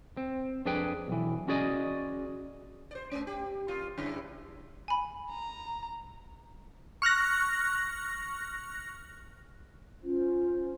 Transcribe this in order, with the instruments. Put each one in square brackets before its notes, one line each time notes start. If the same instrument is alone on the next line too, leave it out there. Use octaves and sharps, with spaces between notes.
[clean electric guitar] C4
F2 D4 G#4 B4 G5
B1 E3
C#4 F#4 G#4 D5 D#5
[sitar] C5 D5
A3 C#4
G4
F2 A#2 F4
F#2 C#3 E4
[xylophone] G#5 B5
[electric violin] A#5
[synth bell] C#6 F6 F#6 A#6
[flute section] C#4 F4 C5